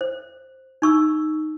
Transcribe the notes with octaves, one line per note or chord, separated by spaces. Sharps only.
C5
D#4 C#6 E6